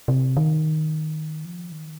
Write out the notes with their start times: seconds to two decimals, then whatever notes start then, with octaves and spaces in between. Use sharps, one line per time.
0.08 C3
0.37 D#3
1.45 F3
1.72 D#3